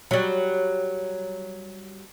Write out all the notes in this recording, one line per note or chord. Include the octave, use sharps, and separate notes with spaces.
F#3 G3